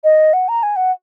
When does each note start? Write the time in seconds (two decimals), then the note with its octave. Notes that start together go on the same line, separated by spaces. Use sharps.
0.04 D#5
0.33 F#5
0.48 A#5
0.63 G#5
0.76 F#5